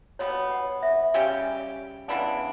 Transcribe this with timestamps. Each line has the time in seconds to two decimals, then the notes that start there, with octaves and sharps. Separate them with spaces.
0.19 B2 G3 B3 C#5
0.51 F#5
0.83 E5
1.14 C#3 G3 C#4 G4
2.08 C#3 E3 B3 D4 F#5